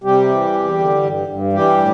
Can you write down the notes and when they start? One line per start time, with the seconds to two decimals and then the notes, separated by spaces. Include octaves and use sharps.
0.04 C3 G3 G4
0.28 E3
0.53 E2
0.78 D3
1.03 G2
1.28 G2
1.53 E3 G3 G4
1.77 A2